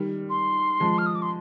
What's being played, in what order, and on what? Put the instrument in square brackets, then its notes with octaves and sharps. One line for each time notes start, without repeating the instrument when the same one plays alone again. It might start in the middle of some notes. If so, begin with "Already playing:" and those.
Already playing: [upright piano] D#3 G3
[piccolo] C6
[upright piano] F3 G#3
[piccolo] F6
D#6
D6
C6